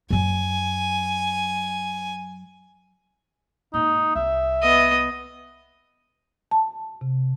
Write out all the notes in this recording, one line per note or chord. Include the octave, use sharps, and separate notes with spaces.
F#2 F#3 G#5
G#2 A#3 D#4
C2 E5
B3 D#5
A5
C3